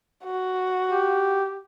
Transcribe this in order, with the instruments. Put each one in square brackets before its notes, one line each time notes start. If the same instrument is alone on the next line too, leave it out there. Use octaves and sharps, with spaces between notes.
[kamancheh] F#4
[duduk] G4